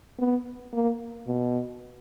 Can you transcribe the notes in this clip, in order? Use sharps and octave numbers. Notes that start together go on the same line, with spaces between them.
B3
A#3
B2